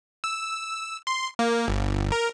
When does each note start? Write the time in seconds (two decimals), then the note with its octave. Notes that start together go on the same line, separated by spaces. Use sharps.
0.24 E6
1.07 C6
1.39 A#3
1.68 G1
2.12 A#4